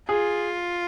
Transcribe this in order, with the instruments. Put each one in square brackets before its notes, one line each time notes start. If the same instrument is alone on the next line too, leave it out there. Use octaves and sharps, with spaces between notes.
[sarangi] F4 [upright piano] G#4